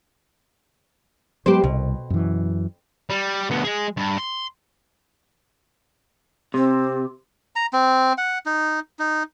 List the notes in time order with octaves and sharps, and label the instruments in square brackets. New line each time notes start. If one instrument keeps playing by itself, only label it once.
[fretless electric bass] F#3 G#3 B3 [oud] G4 B4 C5
[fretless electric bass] C2 [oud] B2
[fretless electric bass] F#2 E3
[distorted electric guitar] G3
D2 B3
G#3 G#4
G2
C6
[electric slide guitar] C3 [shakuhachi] C4
[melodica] A#5
C4
F#5
D#4
D#4